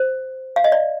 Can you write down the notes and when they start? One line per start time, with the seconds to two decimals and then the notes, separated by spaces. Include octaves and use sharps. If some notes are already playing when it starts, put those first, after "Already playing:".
Already playing: C5
0.56 F5
0.64 D#5
0.72 D5